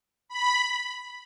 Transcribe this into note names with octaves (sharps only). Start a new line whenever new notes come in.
B5